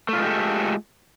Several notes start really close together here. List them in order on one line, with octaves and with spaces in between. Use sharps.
A3 F4 G#3 G4 A4